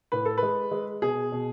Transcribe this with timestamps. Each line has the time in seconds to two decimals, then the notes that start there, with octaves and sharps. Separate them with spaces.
0.12 A2 B4
0.25 A4
0.38 B4
0.43 G#3
0.71 G#3
1.02 B2 G#4
1.32 B2